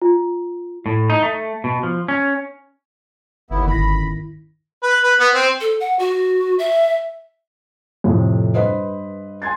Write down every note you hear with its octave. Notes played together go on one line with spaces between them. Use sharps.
F4
A2
D#4
A3
B2
F3
C#4
G1 D#2 B3 E4
G#1 D#3 C#4 E4 B5 A#6
B4
B4
B3
C4
A4
F#5
F#4
E5
F2 A2 C3
G2 B4 C5 D#5
G#5 C6 G#6 A6